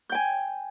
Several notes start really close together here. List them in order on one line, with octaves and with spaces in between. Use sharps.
G6 G5 G#5